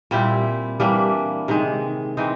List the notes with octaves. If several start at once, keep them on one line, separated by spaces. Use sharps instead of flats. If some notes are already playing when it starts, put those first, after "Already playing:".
A#2 G3 C4 E4
E3 G3 A#3 D4
C3 D#3 G#3
E3 G#3 C4 D#4